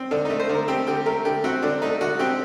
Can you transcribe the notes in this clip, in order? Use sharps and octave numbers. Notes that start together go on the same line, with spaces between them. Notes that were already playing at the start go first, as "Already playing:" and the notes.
Already playing: C4
D3 D4
A3 D#4
C5
D3 A#4
C4 G4
D3 G4
A3 A#4
D3 G4
C4 F#4
D3 D4
A3 D#4
D3 F#4
C4 G4